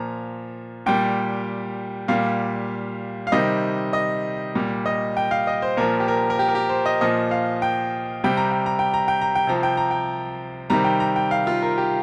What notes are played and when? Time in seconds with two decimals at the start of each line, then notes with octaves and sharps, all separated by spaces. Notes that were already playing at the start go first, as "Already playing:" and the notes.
Already playing: A#2 F3 A#5
0.86 A#2 G3 G5
2.08 A#2 G3 F5
3.27 F5
3.32 C3 D#3 G3 D#5
3.93 D#5
4.55 A#2 G3
4.86 D#5
5.17 G5
5.31 F5
5.47 D#5
5.62 C5
5.77 A#2 F3 A#4
6.00 G4
6.08 A#4
6.30 A#4
6.39 G4
6.49 A#4
6.55 G4
6.69 C5
6.86 D#5
7.01 A#2 F3 D#5
7.31 F5
7.62 G5
8.24 C3 G3 G5
8.37 A#5
8.51 G5
8.66 A#5
8.79 G5
8.94 A#5
9.08 G5
9.21 A#5
9.35 G5
9.47 C3 F3 A#5
9.63 G5
9.77 A#5
9.91 G5
10.70 C3 D#3 G3 A#5
10.84 G5
11.00 A#5
11.16 G5
11.31 F5
11.47 F4
11.62 A#4
11.78 G4